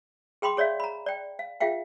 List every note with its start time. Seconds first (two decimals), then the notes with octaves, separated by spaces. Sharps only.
0.42 G#4 G5 B5 C6 D6
0.57 G#4 C#5 D5 E5 F5
0.80 A#5 B5
1.06 D5 G5
1.39 F5
1.60 F4 G#4 E5 F5 G5